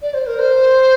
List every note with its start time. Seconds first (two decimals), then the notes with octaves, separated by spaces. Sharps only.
0.02 D5
0.14 C5
0.27 A#4
0.39 C5